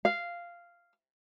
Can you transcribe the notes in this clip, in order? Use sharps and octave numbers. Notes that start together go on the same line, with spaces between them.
F5